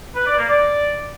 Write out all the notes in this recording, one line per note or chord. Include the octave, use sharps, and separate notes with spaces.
B4
D5
A#3
D5